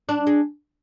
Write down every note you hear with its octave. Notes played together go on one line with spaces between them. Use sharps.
D4
G#3